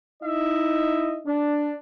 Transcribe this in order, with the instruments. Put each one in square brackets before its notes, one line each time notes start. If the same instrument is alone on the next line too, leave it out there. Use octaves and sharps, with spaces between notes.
[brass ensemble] D#4 E4 D#5 E5
D4